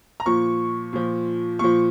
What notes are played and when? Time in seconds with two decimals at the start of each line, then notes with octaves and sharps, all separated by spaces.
0.20 A#5
0.26 A#2 F3 C#6
0.93 A#2 F3
1.59 A#2 F3 C#6